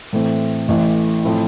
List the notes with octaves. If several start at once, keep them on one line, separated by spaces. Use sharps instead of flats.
A2 E3 A3 C4
A1 A2 E3 A3
A2 F3 C4 E4